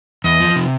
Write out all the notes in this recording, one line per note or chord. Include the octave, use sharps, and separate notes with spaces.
E2 D#5
F3
C3